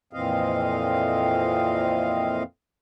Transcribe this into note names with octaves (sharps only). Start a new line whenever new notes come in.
F2 A#2 E3 C4 D#5 F5